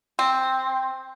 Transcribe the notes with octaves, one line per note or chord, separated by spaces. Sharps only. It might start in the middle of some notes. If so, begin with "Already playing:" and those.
C4